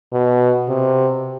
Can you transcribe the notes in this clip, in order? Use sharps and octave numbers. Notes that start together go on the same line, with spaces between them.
B2
C3